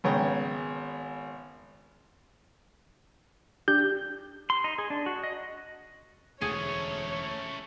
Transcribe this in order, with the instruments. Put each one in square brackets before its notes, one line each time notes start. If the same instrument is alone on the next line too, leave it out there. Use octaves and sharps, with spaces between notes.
[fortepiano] G#1 C#3 B3 C#5 G5 A#5
[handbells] D4 G4 [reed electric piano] G6
[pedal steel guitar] C6
D#4
G#4
D4
F#4
D#5
[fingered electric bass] E1 D2 [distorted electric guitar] A3 C#4 [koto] G#4 [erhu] C#5